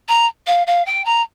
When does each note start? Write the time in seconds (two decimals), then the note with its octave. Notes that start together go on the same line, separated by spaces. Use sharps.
0.08 A#5
0.47 F5
0.67 F5
0.86 G5
1.05 A#5